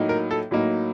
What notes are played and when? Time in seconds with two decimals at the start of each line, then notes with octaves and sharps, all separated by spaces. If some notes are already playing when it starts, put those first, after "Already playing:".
Already playing: A2 F#3 A#3 D#4
0.09 A#4
0.31 A4
0.51 A2 F#3 A#3 D#4